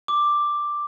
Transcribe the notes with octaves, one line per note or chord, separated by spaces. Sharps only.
D6